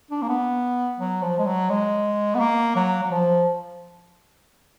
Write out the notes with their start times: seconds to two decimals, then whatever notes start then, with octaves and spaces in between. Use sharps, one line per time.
0.11 D4
0.22 A#3
0.29 B3
1.00 F#3
1.23 F3
1.39 G#3
1.46 F#3
1.70 G#3
2.35 B3
2.40 A#3
2.76 F#3
3.03 F#3
3.11 F3